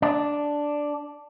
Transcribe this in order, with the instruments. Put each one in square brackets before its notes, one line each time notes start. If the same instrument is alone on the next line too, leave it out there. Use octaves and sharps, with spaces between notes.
[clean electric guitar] D4